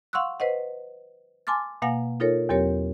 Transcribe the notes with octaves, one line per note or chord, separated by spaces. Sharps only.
F5 F#5 C6 C#6 E6 F#6
B4 C5 D#5 F#5
G#5 A5 C6 D6 F6 A6
B2 A#3 F5 F#5 G#5 A#6
D#4 F4 A4 A#4 C#5
E2 F#3 C4 G4 A#4 C#5